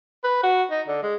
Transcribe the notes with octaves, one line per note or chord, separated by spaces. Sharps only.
B4
F#4
D#4
D3
G#3